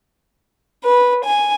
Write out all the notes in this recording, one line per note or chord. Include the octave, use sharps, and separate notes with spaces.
B4
G#5